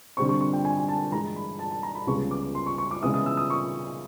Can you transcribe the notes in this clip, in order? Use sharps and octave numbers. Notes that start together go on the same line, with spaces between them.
D3 G3 C4 C#6
C#6
C#6
G5
G#5
G#5
A5
G2 E3 G#3 A#5
B5
A5
A5
A#5
B5
C#2 C#3 E3 G3 B3 C#6
D6
C6
C#6
C#6
D6
C#3 E3 G#3 B3 E4 D#6
D#6
E6
D#6
C#6